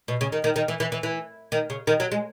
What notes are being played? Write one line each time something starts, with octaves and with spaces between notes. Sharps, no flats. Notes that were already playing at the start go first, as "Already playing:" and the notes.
B2
C#3
D#3
D#3
D#3
E3
E3
E3
E3
D#3
C#3
D#3
F#3
G#3